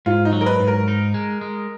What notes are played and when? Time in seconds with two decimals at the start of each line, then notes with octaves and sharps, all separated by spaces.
0.06 G#2 F4
0.25 D#4
0.33 F#3
0.41 A#4
0.46 B4
0.60 G#2
0.67 A#4
0.88 D#4
1.14 G#3
1.41 G#3